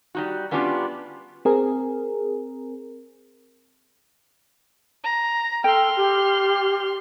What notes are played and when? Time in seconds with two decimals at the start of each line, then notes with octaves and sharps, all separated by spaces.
0.15 G3 D#4 F#4
0.51 G3 B3 C#4 D4 F4 G4
1.45 C4 G#4 A#4
5.04 A#5
5.64 A4 G5 C6 F6
5.97 G4